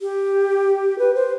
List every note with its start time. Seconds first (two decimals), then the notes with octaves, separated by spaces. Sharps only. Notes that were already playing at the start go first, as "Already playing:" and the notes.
0.02 G4
0.98 B4
1.15 C5